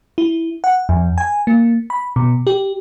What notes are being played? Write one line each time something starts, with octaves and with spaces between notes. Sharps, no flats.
E4
F#5
F2
G#5
A#3
B5
B2
G4